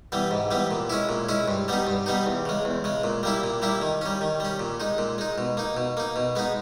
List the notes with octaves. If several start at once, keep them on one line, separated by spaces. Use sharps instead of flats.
E3 G3 B3
G#2
E3 G3 B3
A#2
G#3 C#4 E4
A#2
G#3 C#4 E4
G2
G3 B3 D#4
G2
G3 B3 D#4
E2
C#3 G#3
E2
C#3 G#3
A#2
G3 A#3 E4
A#2
G3 A#3 E4
D#3
G3 C#4
D#3
G3 C#4
A#2
G#3 D#4
A#2
G#3 D#4
B2
A#3 D#4
B2
A#3 D#4
B2
G#3 B3 D#4